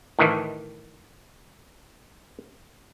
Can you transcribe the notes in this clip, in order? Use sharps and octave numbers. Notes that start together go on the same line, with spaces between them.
A2 D#3 E3